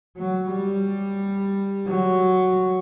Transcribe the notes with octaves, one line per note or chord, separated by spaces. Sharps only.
F#3
G3
F#3